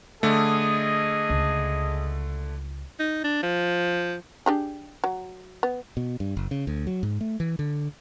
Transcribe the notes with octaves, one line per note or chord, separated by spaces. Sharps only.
D3 A3 G#4 D#5
C#2
D#4
D4
F3
D4 G4 G#4
F#3
B3
B2
G2
F#1
C#3
D2
F#3
G#2
A3
E3
D3